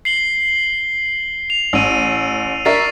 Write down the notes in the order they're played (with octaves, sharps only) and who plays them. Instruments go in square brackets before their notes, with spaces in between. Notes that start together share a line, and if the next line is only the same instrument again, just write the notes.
[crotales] C7 F#7 G7
F7
[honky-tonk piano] A1 [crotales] E6 D#7
[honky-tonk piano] D4 A#4 E5 [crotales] C#6 A6 C7